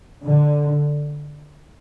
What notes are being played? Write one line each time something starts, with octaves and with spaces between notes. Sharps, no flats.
D3